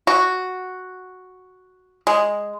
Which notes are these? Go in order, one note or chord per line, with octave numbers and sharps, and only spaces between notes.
F#4
G#3